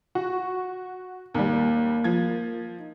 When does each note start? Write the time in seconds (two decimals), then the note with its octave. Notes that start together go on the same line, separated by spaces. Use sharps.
0.15 F#4 C#6
1.34 D#2 G3 A#3
2.04 F3 G#6
2.78 D#4